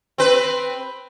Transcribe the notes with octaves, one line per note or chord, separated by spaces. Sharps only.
C4 B4